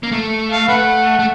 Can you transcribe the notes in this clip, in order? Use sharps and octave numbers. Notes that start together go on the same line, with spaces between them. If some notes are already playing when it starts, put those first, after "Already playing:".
A#3
A3
F5
A3 B4 F#5
A3